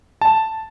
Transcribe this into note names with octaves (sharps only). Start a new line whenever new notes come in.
A5